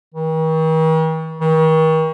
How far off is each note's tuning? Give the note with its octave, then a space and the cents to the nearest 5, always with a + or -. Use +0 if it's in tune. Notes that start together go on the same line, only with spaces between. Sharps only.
D#3 +45
D#3 +40